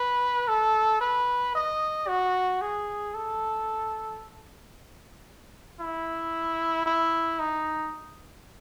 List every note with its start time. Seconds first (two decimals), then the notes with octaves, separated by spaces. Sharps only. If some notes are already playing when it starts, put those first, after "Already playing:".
Already playing: B4
0.48 A4
1.01 B4
1.55 D#5
2.08 F#4
2.61 G#4
3.14 A4
5.80 E4
6.86 E4
7.40 D#4